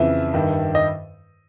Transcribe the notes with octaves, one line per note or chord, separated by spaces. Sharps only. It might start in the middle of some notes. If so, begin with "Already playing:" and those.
Already playing: F2 C#3 E3 E4 E5
G2 D#3
D#5